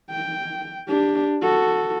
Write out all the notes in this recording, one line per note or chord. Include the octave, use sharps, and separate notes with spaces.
G5
D4 G4
F#4 A4